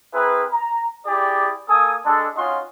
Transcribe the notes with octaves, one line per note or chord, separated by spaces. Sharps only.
C4 E4 G#4 A#4 B4
A#5
E4 G4 G#4 D5
A#3 A4 G#5 D#6
G#3 D4 A4
C#4 D#4 F4 F#4 D#5 C6